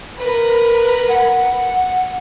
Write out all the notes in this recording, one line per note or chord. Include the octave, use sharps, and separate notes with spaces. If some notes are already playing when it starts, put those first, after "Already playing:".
A#4 B4 B5
F#5